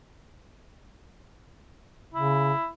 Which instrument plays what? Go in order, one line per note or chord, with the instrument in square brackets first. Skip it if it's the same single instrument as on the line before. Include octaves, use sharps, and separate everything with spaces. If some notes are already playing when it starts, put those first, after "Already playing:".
[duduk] C#3 [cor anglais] E4